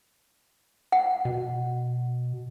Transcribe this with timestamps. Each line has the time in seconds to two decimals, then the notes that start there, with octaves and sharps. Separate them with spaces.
0.92 F#5
1.25 B2